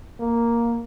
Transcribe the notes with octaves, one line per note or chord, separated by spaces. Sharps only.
A#3